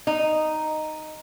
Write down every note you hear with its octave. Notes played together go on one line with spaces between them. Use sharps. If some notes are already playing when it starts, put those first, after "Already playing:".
D#4